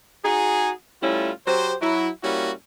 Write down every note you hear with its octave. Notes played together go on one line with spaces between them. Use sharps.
D#4 F#4 G#4
G3 A3 C#4 E4 F4
F#3 G4 C5
F#3 E4
G3 A#3 C#4 E4 F#4